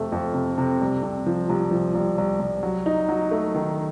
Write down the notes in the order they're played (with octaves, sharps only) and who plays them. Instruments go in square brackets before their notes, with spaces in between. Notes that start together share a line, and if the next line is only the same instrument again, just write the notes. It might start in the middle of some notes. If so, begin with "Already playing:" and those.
Already playing: [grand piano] F2 C3 A3
F2
C3
C3
C2
C3
F3
C2
F3
C2
C2
C2
F#3
D#4
F#3
A3
D#3